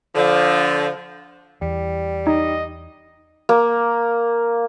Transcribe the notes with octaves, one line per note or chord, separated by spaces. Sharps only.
D3 F3
E2 G3
D#4 D#5
A#3